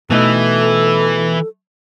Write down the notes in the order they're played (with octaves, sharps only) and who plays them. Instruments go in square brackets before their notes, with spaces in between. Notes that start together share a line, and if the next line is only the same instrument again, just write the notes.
[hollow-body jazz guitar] B2 A3 D#4 [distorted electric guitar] E3 [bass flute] A4